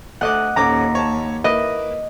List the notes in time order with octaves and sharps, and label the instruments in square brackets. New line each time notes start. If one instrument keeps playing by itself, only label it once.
[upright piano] D2 A3 D6 [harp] D#5 F#5
[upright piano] D#1 C#4 D6 [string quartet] D#2 [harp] A#5
[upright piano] C#5 A5
[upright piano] A#3 E4 B4 [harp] D#5